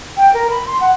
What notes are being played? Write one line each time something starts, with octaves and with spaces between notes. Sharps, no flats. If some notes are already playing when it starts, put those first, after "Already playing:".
G5
A#4
B5
C6
F#5